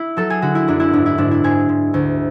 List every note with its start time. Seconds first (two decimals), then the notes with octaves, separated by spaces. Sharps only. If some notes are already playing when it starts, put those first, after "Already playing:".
Already playing: E4
0.17 F#3 A4
0.30 G#4
0.42 D3 F#4
0.55 E4
0.68 F#2 D4
0.80 E4
0.92 G#2 D4
1.06 E4
1.18 G#2 D4
1.31 E4
1.44 G#2 G#4
1.69 G#2
1.94 D2